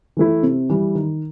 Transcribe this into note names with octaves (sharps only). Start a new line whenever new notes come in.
E3 A3 E4
C3
E3 G3
D#3